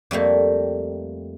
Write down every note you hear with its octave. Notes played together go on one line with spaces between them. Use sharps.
F2 G3 A3 A#3